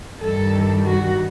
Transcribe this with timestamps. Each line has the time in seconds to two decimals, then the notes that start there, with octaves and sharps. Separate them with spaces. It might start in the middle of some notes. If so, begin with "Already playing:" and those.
0.20 G2 D#3 G3 A4
0.85 F#4